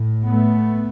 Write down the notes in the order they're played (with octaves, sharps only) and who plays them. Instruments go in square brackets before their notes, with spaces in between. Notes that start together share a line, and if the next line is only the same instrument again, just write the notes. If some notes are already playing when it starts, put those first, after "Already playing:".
Already playing: [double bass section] A2
A3 B3